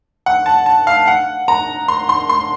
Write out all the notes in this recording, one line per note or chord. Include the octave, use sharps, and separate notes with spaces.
F#5
A5
A5
F5
F#5
A#5
C6
C6
C6